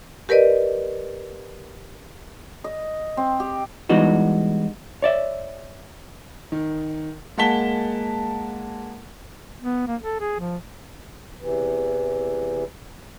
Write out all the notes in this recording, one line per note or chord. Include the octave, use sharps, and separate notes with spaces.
G4 A#4 B4 D5 D#5
D#5
C4
G4
E3 G3 G#3 B3 D#4 F#4
C#5 D5 E5
D#3
G#3 A#3 F#5 A5 B6 G7
B3
A#3
A4
G#4
F3
E2 C3 E3